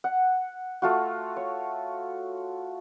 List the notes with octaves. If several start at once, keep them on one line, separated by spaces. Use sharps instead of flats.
F#5
A3 F4 F#4
C#5